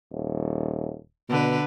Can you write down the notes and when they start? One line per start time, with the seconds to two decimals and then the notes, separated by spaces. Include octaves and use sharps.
0.12 D#1
1.29 B2 D3 B4